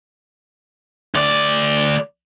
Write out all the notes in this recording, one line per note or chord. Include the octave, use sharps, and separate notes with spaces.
D2 D5